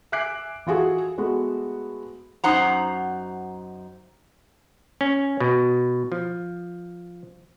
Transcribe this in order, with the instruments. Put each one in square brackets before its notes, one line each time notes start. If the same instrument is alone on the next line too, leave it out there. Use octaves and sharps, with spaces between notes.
[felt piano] E5 G#5 D6 F#6 C7 D7
E3 F4 F#4 G#4 A4
G#3 A3 B3 F#4 A4
[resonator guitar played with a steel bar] F#2 D#4 C5 F#5 A#5
[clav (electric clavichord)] C#4
B2
F3